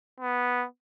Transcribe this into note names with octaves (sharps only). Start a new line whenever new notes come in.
B3